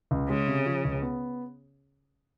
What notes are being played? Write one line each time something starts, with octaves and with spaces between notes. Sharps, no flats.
C#2
C#3 G#3
C3
F3
C#2
B3